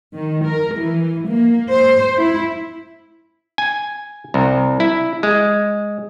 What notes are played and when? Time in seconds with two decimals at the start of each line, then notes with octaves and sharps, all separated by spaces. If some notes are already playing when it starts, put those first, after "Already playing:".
0.14 D#3
0.43 A#4
0.77 E3
1.28 A#3
1.70 C5
2.17 E4
3.58 G#5
4.34 C2
4.80 E4
5.23 G#3